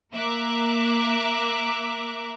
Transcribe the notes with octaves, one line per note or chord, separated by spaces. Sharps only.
A#3 E5 A#5 D6 F#6